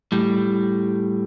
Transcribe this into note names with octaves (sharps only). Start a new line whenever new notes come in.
A2 G3